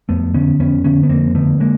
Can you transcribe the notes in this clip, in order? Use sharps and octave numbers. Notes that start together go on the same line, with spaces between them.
F2 A3 B3
D3 B3 C#4
F2 B3 C#4
D3 B3 C#4
B3
F2 A#3 C4
D3 A3 B3
G#3 A#3